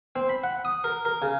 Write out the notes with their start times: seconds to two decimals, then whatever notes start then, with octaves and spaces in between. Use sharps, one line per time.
0.16 C4
0.29 B5
0.44 F#5
0.65 D#6
0.84 A#4
1.05 A#4
1.22 C#3